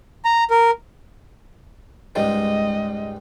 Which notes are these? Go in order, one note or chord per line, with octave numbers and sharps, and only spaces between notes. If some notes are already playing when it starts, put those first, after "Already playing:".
A#5
A#4
C#2 G#2 G3 D#5